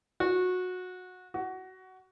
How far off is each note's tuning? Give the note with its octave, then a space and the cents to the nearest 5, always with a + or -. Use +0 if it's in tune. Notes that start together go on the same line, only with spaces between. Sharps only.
F#4 -20
F#4 +15